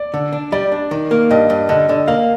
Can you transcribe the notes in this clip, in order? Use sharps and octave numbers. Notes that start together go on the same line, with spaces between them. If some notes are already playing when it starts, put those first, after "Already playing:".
Already playing: D5
D3
D4
G3 D5
D4
D#3
A#3
G2 D#5
G2
D3 D#5
D3
A#3 F5